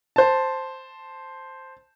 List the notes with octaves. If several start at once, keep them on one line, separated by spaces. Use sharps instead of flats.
C5 A5